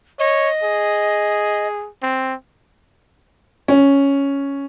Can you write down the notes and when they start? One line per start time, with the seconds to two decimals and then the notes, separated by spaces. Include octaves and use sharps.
0.19 C#5 D#5
0.63 G#4
2.02 C4
3.68 C#4